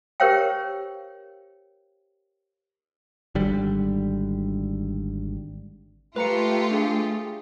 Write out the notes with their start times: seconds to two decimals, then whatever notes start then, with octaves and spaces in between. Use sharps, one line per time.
0.20 G4 A#4 C5 C#5 F5 G5
3.35 G#1 D3 G3
6.16 A3 F4 G4 B4 A#5 C#7
6.71 D4 G#4